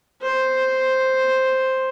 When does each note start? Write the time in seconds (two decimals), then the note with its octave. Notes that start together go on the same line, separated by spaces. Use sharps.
0.22 C5